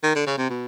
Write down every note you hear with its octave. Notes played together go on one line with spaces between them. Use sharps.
D#3
D3
C#3
C3
B2